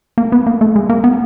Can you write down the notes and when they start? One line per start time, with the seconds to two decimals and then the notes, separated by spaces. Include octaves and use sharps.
0.18 A#3
0.32 B3
0.47 A#3
0.61 A3
0.76 G#3
0.90 A#3
1.04 B3